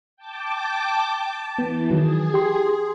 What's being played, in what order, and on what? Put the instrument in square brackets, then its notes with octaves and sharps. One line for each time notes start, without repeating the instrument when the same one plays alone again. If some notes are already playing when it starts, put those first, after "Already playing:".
[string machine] G5 A5 D6
A5
[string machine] E3 [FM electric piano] B3
[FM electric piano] D#3 F#3 [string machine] G#4
[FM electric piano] G4 C6